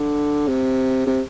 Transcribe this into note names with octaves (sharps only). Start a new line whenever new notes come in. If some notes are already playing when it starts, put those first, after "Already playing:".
Already playing: D3
C3
C3